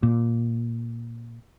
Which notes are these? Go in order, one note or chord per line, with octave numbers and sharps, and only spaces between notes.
A#2